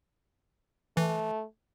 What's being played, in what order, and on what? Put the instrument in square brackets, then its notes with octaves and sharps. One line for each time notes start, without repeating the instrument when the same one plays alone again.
[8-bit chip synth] E3 [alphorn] A3